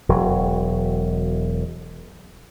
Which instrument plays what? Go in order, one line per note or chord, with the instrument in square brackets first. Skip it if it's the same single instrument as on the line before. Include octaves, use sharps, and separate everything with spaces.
[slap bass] E1 F#3